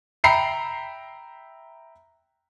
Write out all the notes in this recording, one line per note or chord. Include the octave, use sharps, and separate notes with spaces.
E5 G5 A#5 B5 C7 C#7